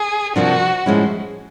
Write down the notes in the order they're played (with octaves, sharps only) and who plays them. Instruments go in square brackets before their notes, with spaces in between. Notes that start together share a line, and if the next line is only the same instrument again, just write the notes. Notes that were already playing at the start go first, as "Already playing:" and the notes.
Already playing: [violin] G#4
[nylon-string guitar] C3 F3 A#3 D4 [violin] F#4
[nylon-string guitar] A2 F3 G#3 C#4 E4